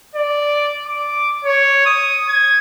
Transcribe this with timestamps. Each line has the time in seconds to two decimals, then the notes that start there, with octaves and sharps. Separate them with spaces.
0.15 D5
0.87 D6
1.45 C#5
1.86 D#6
2.29 G#6